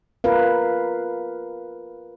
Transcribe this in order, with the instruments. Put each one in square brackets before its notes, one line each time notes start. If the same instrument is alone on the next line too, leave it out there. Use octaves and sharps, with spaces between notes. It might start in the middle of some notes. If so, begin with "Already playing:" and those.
[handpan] F4 A#4 B4 F5